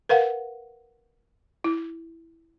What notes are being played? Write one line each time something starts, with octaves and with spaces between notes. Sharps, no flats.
A#4 B4 F5 F#5
E4